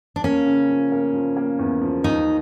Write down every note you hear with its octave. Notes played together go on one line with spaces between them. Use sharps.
D4
A#3 C#4
C#3
F3
A#3
F3
A#3
E2
F3
D#2 D#4